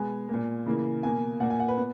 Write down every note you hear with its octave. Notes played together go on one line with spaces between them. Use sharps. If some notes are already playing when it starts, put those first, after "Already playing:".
Already playing: B2 G#3 B3 G#5
A#3
A#2
C#3 E3 A#3
B2 A#3 G#5
A#2 A#3 F#5
G#5
F#5
B4
B3